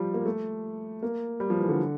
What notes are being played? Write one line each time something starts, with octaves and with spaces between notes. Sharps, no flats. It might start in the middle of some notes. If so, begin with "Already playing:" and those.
Already playing: F3 G3
A#3
A3
A#3
G3
F3
E3
D3